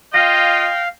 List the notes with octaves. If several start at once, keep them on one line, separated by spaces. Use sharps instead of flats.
F4 D#5 F5 G5 A#6